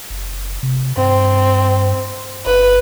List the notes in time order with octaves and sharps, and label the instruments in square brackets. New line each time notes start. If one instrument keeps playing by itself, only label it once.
[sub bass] F#1
C3
[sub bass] G2 [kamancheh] C4
[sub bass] G1 [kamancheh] B4